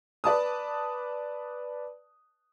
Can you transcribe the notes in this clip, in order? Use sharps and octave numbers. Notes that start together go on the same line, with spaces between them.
B4 D5 A5 D#6